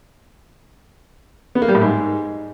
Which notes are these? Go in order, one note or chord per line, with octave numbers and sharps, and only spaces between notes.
B3
A#3
G3
A2
G#2